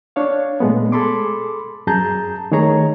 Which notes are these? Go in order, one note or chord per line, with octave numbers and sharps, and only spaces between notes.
D4 C#5 F5
A#2 G#3 A3 B3
G#4 A4 B5 C6 D6
F#2 G#4 A5 A#5 G6
D#3 A3 G#4 C#5 A#5